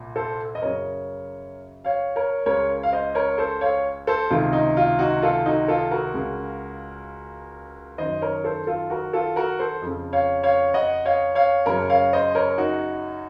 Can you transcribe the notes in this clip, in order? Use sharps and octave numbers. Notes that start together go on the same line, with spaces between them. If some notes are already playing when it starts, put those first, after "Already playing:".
Already playing: C2 A#2
A4 C5
D#5
F#2 C#3 A#4 C#5
C#5 F5
A#4 C#5
C#2 C#3 A#4 C#5
F5
C5 D#5
A#4 C#5
A4 C5
C#5 F5
A4 C5
C#2 C3 D#3 F4
D#4
F4
D#4 F#4
F4 A4
D#4 F#4
F4 A4
F#4 A#4
C#2 C#3
F#2 D#3 C5 D#5
A#4 C#5
A4 C5
F4 A4
F#4 A#4
F4 A4
F#4 A#4
A4 C5
F2 C#3
C#5 F5
C#5 F5
D#5 F#5
C#5 F5
C#5 F5
F#2 C#3 A#4 C#5
C#5 F5
C5 D#5
A#4 C#5
D#4 F#4